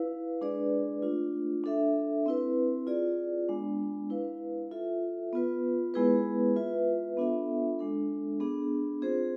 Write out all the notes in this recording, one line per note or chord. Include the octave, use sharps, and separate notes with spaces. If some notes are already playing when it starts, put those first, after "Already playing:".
Already playing: E4 B4 F5
G#3 D4 G#4 B4 D5
A3 D4 F4
D4 A4 E5
C4 E4 B4
F4 G#4 D5
G#3 B3 D4
E4 B4 F5
F4 A4 E5
B3 F4 B4
G#3 B3 E4 G#4 B4
F4 B4 E5
B3 D4 F4 A4 E5
G#3 D4 A4
B3 D4 G#4
C4 F4 G#4 C5